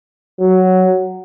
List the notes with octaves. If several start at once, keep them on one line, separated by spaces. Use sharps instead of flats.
F#3